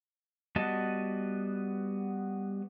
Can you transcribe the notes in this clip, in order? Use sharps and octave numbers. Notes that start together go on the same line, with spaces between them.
G3 B3 F#4 D#5 A5